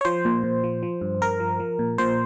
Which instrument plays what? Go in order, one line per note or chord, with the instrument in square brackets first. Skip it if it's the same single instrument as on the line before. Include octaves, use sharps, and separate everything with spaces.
[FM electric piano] C#5
F3 C5
A#2
A#2
F3
F3
G2
G2 A#4
F3
F3
A#2
A#2 C5